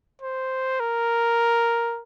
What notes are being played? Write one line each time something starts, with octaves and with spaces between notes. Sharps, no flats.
C5
A#4